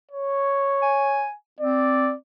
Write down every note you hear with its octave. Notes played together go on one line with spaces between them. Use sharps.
C#5
G#5
C4 D5